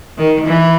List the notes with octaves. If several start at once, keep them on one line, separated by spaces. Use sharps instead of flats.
D#3
E3